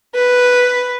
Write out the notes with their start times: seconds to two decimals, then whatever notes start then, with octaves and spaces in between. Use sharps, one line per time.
0.14 B4